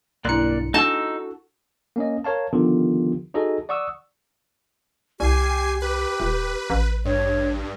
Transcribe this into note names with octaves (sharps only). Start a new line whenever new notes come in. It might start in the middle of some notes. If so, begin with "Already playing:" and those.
B1 G2 A#3 E4 D5 C6 F#6 C#7
D4 D#4 F#4 A4 A5 E6
A#3 C#4 D#5
A#4 C#5 F5 A5
D3 D#3 F3 B3 F4 G4
D#4 F#4 G#4 A4 D#5
D5 F#5 C#6 D#6 E6
C2 G4 G#5 C7
G4 B4
D#1
A1
G2 C#5